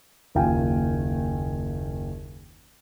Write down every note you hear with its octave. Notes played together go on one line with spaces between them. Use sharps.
F#1 D#2 F4 F5 G5 G#5